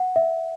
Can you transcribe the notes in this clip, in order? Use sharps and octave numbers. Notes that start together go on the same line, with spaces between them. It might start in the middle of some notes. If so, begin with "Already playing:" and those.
Already playing: F#5
E5